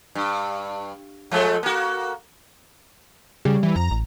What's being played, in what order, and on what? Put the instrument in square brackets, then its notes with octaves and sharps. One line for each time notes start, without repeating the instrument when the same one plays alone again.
[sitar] G2
F3 G#3 A3
A#3 F#4
[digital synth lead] C#3 [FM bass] G3
[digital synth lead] E3
[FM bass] F2 [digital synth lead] A#5
[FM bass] A1